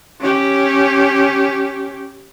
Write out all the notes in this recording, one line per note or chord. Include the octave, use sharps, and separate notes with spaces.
C#4 G4